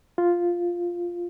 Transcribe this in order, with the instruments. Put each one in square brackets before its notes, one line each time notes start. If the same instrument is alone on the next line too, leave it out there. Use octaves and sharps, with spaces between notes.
[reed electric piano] F4